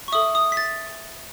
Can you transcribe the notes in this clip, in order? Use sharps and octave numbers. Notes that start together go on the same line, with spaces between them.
C#6
A4 E5 D#6
D#6
B6
A6